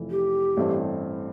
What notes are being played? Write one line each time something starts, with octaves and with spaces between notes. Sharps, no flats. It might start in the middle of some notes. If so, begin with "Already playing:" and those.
Already playing: F1 F2 E3
G4
A1 G2 E3 A3 C4